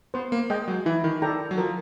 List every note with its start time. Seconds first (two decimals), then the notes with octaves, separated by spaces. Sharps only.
0.14 B3 C5
0.32 A#3
0.50 G#3 D#5 G5
0.68 F#3
0.86 E3 E4
1.04 D#3
1.22 D#3 A4 D5 G5 A#5
1.51 F#3
1.57 F3 A#4